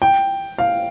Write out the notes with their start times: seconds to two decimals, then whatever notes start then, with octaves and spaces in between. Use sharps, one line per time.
0.02 G5
0.58 F5